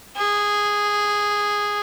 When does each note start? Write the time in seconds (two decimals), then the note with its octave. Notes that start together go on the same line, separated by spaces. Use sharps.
0.17 G#4